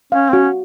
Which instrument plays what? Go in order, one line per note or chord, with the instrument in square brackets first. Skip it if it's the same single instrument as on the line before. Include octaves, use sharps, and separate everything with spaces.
[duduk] C#4 [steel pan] F5
[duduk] C4
[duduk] C#4 [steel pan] F#4